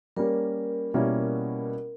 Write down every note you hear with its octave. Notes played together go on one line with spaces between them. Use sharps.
G3 A#3 C#4 A#4
B2 G3 A#3 C#4 E4